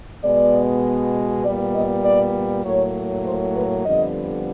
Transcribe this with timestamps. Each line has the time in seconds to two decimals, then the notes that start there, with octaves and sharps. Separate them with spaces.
0.24 B2 G#3 B3 D5
1.45 A#2 G3 B3 D5
1.75 D#5
2.05 D5
2.65 A2 F#3 A#3 C#5
3.26 C5
3.56 B4
3.86 F2 D3 G3 B3 D#5